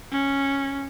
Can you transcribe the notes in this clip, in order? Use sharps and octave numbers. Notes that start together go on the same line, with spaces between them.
C#4